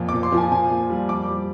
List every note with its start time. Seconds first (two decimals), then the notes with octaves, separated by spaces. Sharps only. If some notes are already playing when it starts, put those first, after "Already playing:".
Already playing: F2 A#2
0.09 D6
0.13 A#2
0.23 C6
0.32 F3
0.37 G#5
0.52 A#2 G#5
0.70 A#2
0.90 G3
1.09 F2 D6
1.28 G3